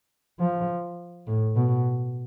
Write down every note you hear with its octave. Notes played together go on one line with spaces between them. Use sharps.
F3
A2
B2